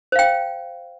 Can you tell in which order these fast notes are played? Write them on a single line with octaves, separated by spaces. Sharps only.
C5 F5 G5